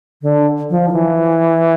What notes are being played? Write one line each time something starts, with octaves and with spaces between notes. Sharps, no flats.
D3
F3
D#3
E3